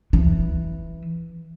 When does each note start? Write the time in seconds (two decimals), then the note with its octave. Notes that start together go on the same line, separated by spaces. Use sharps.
0.13 E3